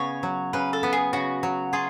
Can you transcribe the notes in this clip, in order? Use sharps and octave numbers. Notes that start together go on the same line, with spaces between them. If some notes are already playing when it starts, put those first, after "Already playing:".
Already playing: C#3 B3 C#5
F#3
C#3 B4
A4
B3
G#4
C#3 F#4
F#3
F4 G#4